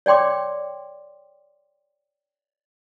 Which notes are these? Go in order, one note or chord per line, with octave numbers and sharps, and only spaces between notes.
C#5 D5 G5 C6 D6